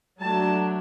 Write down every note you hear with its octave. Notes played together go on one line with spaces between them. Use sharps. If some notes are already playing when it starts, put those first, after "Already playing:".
F#3 A3 D4 A5